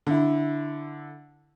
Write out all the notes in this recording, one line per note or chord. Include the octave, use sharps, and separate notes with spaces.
D3 E4